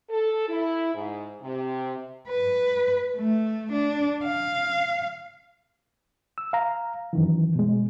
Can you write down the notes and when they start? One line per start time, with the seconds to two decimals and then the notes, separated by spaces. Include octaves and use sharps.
0.10 A4
0.49 E4
0.95 G#2
1.43 C3
2.29 B4
3.17 A3
3.72 D4
4.23 F5
6.38 E6
6.53 F5 A#5
7.13 F#2 D#3 E3
7.55 B2 G#3